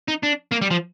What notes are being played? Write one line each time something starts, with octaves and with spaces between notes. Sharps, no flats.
D#4
D4
A#3
G3
F3